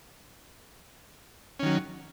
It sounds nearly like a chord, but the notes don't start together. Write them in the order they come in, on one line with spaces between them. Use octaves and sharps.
C#4 D#3 F#3